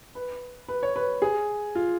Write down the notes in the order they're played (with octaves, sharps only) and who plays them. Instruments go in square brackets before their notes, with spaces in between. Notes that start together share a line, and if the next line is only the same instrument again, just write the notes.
[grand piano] B4
B4
C#5
B4
G#4
F4